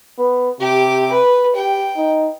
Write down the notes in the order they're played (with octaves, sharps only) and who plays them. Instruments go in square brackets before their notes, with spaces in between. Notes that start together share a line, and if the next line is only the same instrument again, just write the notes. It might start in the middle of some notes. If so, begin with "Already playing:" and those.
[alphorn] B3
[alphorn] C3 [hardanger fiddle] G4 D6
[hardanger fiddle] B4
[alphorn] G4 [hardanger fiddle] G5
[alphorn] D#4